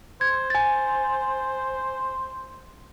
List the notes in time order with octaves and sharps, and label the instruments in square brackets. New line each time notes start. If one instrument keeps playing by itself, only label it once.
[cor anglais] C5 [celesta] G#6
[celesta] G#5 A6